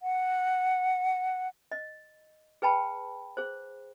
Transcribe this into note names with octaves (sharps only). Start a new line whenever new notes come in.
F#5
D#5
G#4 B4 G5 A5 B5
G#4 C5